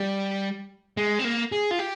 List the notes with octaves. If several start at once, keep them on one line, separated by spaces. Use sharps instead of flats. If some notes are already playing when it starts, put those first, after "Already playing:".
Already playing: G3
G#3
C4
A#3
G#4
F4
G4